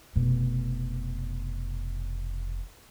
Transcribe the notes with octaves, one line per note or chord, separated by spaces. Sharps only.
F1 B2